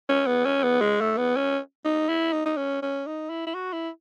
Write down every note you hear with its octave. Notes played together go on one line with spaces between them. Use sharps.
C#4
B3
C#4
B3
G#3
A3
B3
C#4
D#4
E4
D#4
D#4
C#4
C#4
D#4
E4
E4
F#4
E4